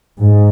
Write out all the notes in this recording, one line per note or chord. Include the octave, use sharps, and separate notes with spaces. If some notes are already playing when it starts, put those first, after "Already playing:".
G#2